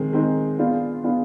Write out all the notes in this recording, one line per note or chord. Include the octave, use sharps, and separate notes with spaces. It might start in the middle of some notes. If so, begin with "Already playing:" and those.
Already playing: D#3 G#3 C4 G#4
D#3 G#3 C4 D#4 G#4
B3 D4 F4 G#4
B3 D4 F4 G#4